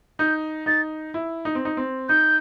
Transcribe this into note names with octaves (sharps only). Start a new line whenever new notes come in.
D#4 G6
D#4 A6
E4
D#4
C4
D#4
C4
D#4 G6